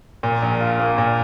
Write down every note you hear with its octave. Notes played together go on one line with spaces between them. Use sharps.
A#2
A#1
F4
A#3
A#2